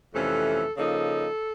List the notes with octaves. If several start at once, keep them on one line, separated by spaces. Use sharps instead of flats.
F2 C3 E3 A3 C#4 A4
C#3 F3 A#3 D#4 A4